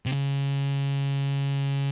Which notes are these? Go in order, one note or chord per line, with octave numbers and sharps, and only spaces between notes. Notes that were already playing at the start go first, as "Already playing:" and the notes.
C3
C#3